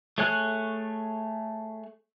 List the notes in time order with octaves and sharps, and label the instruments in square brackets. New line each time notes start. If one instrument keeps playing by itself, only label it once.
[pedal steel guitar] A3 G#4 C#5 G#5 F#6